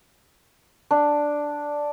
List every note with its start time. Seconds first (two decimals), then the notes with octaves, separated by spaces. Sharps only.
0.91 D4